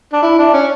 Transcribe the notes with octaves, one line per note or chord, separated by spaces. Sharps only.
D4
E4
D4
C#4